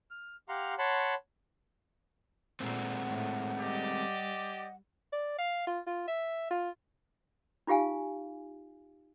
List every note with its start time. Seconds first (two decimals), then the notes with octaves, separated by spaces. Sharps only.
0.11 F6
0.49 G4 F5 F#5 A#5 C6
0.79 C#5 F#5 A5 B5 C6
2.60 A#2 G#3 A3 C4 F#5
3.08 A2
3.60 G3 G4 D5 D#5
5.12 D5
5.38 F5
5.67 F4
5.86 F4
6.07 E5
6.50 F4
7.67 D#4 F4 G4 F5 G#5